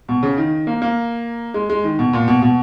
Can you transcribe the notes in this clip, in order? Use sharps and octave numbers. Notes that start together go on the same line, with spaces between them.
B2
C#3
D#3
A#3
A#3
G#3
G#3
D#3
B2
A#2
B2
B2